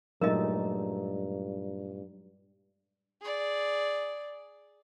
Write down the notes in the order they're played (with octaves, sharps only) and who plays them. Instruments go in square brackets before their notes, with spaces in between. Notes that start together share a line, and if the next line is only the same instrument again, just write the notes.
[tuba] G2 [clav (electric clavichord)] A#2 A3 [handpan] F#3 G#3 D#4 [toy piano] A#4 D#5
[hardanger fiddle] G#4 D5